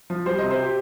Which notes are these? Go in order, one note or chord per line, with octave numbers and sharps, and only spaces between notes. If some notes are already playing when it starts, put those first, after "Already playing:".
F3
G3 C5
C3 D#5
C5
G4